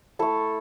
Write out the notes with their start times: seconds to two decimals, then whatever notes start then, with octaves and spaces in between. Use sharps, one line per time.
0.19 A3 E4 A4